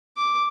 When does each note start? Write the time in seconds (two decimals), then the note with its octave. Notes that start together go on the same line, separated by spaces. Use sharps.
0.17 D6